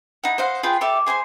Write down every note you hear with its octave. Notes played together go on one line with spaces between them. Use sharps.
D#4 E4 F#5
C5 D#5 F5 F#5
F4 G#4 B4 G5
G4 A4 D5 E5
G#4 C5 G#5 C6